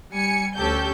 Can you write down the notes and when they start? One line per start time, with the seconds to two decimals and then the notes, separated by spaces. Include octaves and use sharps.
0.12 G3 G#5 C#7
0.56 D2 C#4 G4 A4 G6